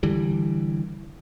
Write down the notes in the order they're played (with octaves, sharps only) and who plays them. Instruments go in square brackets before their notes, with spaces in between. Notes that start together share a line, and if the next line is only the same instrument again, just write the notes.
[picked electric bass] D3 E3 G3